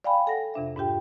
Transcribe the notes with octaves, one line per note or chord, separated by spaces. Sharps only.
D5 F5 G5 G#5 B5
A4 F#5 A#6
F2 C3 D4 E5
G#2 D4 F4 G4 G5